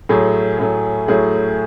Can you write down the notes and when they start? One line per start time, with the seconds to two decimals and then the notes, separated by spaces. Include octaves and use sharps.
0.09 A2 F#3 A3 G#4
0.59 A2 F#3 A3
1.08 A2 F#3 A3 G#4